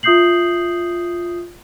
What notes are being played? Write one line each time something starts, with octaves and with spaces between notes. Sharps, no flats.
F4 E5 D#6 G6 C7 F#7